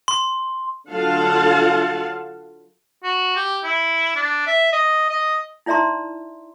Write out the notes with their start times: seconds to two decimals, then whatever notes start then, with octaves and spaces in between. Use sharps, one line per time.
0.08 C6
0.91 D3 F#3 F4 F5 F#5 A5
3.03 F#4
3.35 G4
3.64 E4
4.16 D4
4.47 E5
4.72 D#5
5.09 D#5
5.66 D#4 E4 D5 E5 A#5 C6